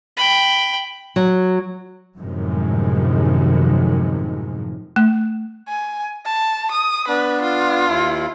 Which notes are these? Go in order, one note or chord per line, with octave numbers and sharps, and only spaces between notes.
G5 B5
F#3
F#2 A2 C3 D#3 F3 G#3
A3
G#5
A5
D#6
B3 D4 B4
F4
D#2 E4